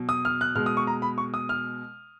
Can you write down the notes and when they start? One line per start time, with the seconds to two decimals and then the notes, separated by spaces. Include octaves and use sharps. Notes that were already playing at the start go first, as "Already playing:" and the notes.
Already playing: B2 F#3
0.09 D#6
0.25 F6
0.41 F#6
0.55 B2 G#3 F6
0.66 D#6
0.77 C#6
0.87 A#5
1.02 B5
1.18 C#6
1.34 D#6
1.49 F6